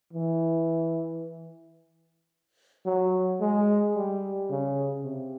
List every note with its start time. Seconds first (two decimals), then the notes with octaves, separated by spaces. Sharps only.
0.13 E3
2.86 F#3
3.40 G#3
3.95 G3
4.50 C#3
5.04 C3